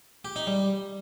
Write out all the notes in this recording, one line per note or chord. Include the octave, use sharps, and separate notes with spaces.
G4
D#4
G3